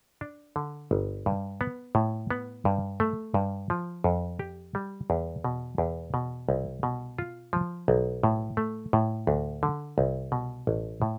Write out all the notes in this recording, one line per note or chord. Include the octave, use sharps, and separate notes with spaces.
D4
D3
G1
G2
B3
A2
B3
G2
A3
G2
F3
F2
G4
G3
E2
B2
E2
B2
C2
B2
F4
F3
B1
A2
A3
A2
D2
D3
C2
B2
A1
A2